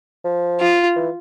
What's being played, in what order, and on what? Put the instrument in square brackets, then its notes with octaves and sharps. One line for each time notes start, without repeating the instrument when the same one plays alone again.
[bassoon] F3
[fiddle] F4
[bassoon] E3